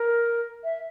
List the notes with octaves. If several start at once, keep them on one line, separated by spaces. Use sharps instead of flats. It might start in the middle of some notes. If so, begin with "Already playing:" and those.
Already playing: A#4
E5